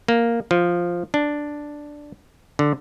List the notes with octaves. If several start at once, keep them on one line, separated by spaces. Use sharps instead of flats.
A#3
F3
D4
D3